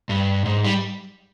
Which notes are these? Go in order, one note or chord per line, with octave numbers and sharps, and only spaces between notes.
G2
G#2
G3